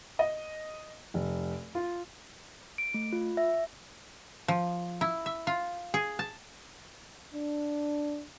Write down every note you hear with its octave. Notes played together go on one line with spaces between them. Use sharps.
D#5
F1
F4
D7
A3
F4
E5
F3
E4
E5
F4
G#4
A5
D4